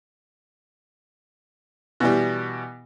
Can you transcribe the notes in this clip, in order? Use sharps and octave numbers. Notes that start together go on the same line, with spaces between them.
B2 E3 G3